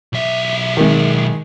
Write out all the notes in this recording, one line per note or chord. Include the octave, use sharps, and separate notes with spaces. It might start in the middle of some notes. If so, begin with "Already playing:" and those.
B1 E5
D#3 G#3